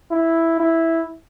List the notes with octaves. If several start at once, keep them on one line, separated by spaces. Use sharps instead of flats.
E4
E4